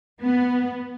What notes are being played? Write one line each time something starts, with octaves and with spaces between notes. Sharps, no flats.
B3